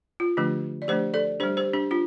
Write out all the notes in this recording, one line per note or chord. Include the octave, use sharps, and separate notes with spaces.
F4
D3 F3 A3 D4 G4
D5
F3 A3 D4 G4 C5
A4 D5
G3 D4 G4 C5
G4 C5
D4 G4
D4 F4